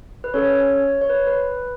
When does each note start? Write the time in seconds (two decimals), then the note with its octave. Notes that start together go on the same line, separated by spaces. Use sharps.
0.24 B4
0.34 C#4 A4 C#5
1.01 C#5
1.10 B4
1.27 B4